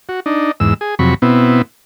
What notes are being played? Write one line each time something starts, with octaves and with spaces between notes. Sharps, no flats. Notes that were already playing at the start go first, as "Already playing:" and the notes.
F#4
D4 D#4
E2 G#2 E6
G#4
F2 C3 F#3 B5 C#6
B2 B3 C4 E4